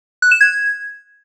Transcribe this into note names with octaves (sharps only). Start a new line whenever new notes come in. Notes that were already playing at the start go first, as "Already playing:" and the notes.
F#6
E7
G#6